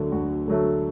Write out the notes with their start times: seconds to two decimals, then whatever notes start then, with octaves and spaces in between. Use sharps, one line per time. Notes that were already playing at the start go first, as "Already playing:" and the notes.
Already playing: D2 D3 F#3 A3
0.12 D2 F#4
0.48 D3 F#3 A3